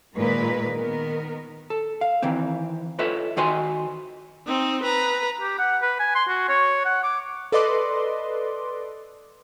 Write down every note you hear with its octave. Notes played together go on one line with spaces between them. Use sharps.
A#2 D#3 G#3 A#4 B4
D#3 B3 A#4
A4
F5
D#3 E3 C4
F4 A4 B4 C#5 D#5 E5
D#3 F#4 C5 D#5 G#5 C6
C4 D#4
B4 A#5
G4
F#5
B4
G#5
C6
F#4
C#5
F#5
D6
A4 B4 D5 D#5 C6 D6